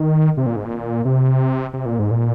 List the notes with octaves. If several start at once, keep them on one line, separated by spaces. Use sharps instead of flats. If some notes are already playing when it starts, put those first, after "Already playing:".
Already playing: D#3
C3
A#2
G#2
A#2
C3
C3
A#2
G#2
A#2